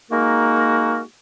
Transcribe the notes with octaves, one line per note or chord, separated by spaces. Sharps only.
G#3 A#3 D#4 F#4 A#4